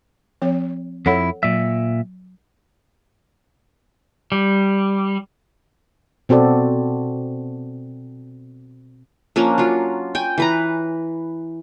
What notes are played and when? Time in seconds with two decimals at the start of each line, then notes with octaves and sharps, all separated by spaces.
0.42 F3 C4 C#5
1.06 F2 E4 A4 C#5 F#5
1.43 A#2 F#3 E5
4.32 G3
6.29 B2 C4 F#4 A4 D5
9.36 F3 A#3 C#4 D4
9.58 F#3 F4
10.15 G5 G#5
10.38 E3 B4 A#5